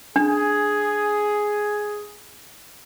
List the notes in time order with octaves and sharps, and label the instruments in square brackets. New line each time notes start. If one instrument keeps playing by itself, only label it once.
[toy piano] D4 [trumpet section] G#4